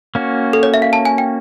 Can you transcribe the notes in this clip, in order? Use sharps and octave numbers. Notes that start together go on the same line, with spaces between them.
A#3 C#4 F#4
A4
C#5
E5
F5
A5
G#5
G5